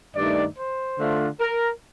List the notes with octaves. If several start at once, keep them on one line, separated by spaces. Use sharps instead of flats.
G2 D#3 A3 D#4 D5
C5
D3 A3 D4 F4
A#4